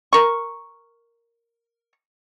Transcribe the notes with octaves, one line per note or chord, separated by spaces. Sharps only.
A#4 C#6